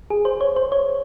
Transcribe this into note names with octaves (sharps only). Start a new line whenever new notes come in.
G#4
C5
C#5
C5
C#5